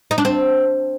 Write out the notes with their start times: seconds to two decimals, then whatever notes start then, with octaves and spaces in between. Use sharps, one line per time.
0.11 D#4
0.18 D4
0.25 C4